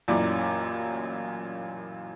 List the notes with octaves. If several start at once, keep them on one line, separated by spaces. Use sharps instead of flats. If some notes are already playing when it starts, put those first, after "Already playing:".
A1 F#2 A#2 E4 D5 D6